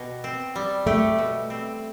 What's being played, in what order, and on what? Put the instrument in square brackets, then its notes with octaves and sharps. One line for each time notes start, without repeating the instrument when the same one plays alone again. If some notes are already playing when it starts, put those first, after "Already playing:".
Already playing: [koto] B2 G4
C4
G3
[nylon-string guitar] A3 [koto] G4
[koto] B2
C4